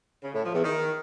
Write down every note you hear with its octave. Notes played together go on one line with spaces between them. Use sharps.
C#3
A2
F3
E2
D#3